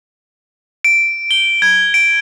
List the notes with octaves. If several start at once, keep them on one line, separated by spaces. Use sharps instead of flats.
D7
G7
G#6
D7